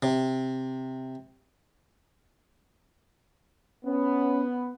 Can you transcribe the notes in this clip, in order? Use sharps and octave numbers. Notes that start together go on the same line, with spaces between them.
C3
B3 C#4